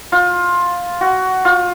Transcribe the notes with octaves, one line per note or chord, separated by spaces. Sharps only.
F4
F#4
F4